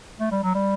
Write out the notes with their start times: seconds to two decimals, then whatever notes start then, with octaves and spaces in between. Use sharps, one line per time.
0.20 A3
0.31 G3
0.43 F#3
0.55 G3